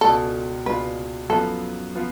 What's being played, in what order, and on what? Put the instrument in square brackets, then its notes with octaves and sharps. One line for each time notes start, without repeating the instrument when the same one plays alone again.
[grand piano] C#2 B2 G#3 D4 F4 [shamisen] A4
[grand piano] C#2 B2 G#3 D4 F4 [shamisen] B4
[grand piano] F#2 F3 B3 F4 [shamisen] A4
[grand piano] F3 B3 F4